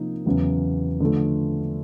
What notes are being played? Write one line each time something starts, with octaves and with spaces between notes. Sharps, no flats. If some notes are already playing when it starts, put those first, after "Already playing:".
Already playing: C3 F3 A#3 D#4
E2 C#3 F#3
D3 F3 A3